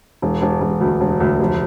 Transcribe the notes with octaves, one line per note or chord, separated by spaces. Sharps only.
E1
E1
E1
D2
E1
D2
F1